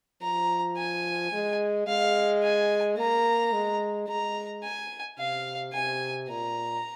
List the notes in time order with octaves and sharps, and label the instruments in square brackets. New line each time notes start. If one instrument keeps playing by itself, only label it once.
[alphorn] F3 [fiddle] A#5
[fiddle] G#5
[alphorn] G#3
[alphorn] G#3 [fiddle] F5
[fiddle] G#5
[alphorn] A#3 [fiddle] A#5
[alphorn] G#3
[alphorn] G#3 [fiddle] A#5
[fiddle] G#5
[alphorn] C3 [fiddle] F5
[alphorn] C3 [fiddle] G#5
[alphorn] A#2 [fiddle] A#5